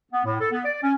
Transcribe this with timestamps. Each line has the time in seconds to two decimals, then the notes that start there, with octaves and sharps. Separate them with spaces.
0.12 B3
0.24 A2
0.40 A4
0.52 B3
0.64 D5
0.82 C#4